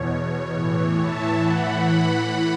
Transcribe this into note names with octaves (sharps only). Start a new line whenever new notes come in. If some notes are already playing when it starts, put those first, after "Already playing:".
Already playing: E2 B2 C#5
A2 E3
E5 A5
A2 E3 F#5 B5
F#5 B5